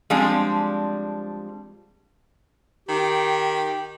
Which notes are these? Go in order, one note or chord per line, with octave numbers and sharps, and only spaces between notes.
F3 G3 G#3 C4 D4
D#3 G4